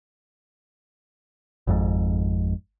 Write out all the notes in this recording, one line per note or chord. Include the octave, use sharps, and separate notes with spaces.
G#1 F2 G#2